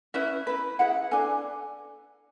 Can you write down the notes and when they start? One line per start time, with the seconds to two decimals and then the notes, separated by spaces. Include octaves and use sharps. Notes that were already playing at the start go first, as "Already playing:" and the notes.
0.14 C#4 E4 B4 E5
0.47 E4 B4
0.79 E4 G#4 B4 F#5
1.11 D4 A4 G#5